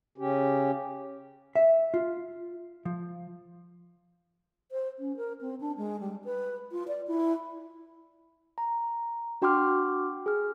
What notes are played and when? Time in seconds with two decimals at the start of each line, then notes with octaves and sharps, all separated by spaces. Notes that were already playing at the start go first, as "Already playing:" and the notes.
0.18 C#3 C#4 G4
1.55 E5
1.94 F4
2.85 F3
4.72 C5
4.99 C#4
5.17 A#4
5.41 C4
5.60 D4
5.77 G#3
6.00 G3
6.24 B4
6.72 F4
6.88 D5
7.07 E4
8.58 A#5
9.42 D4 F#4 G5 C6 D6 F6
10.26 G#4 F6